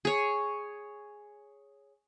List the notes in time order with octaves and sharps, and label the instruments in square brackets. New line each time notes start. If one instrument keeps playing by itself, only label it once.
[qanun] G#4 C#5